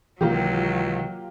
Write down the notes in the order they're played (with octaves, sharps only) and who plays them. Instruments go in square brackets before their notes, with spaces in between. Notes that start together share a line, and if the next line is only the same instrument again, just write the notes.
[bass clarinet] C#2 [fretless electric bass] C3 D#3 E3 [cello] F#3 [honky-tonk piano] A#3 F4 G4